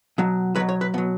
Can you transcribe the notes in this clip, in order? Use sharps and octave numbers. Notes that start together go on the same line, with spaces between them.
B2 F#3
B2 F#3 B4
C#5
B4
B2 F#3 B3